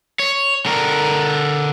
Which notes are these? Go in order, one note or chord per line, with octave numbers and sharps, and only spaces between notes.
C#5
D3 A#4